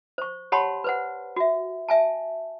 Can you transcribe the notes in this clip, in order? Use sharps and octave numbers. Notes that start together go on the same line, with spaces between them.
C5 C#6
G4 C#5 F#5 A5 B5 C6
B4 C5 F#5
F#4 E5
E5 G#5 A5